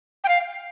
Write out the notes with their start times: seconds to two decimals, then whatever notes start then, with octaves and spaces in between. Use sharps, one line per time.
0.24 G5
0.28 F5